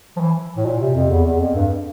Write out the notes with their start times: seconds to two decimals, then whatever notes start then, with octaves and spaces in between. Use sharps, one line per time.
0.17 F3
0.20 E3
0.57 A2
0.65 A#2
0.81 C3
0.95 F2
1.10 E2
1.26 E2
1.40 F2
1.55 G2